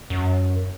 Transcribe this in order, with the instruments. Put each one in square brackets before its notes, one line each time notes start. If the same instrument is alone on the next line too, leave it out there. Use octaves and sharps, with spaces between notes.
[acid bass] F#2